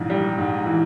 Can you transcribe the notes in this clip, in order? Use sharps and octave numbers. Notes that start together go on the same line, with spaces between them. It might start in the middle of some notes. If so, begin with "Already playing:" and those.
Already playing: A#1 G#2 E3
G3
G#2
E3